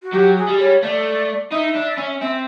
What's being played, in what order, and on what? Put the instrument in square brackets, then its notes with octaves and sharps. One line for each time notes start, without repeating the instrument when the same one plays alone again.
[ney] F#4
[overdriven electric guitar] F#3 [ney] G4
[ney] G#4
[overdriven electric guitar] G3
[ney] C#5
[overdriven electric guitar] A3 [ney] D5
[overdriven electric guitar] D#4 [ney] E5
[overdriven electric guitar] D4
C#4
[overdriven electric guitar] C4 [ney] E5